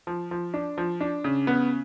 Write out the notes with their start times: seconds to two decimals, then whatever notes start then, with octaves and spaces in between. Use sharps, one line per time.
0.07 F3
0.31 F3
0.54 D4
0.78 F3
1.01 D4
1.24 C#3
1.47 B3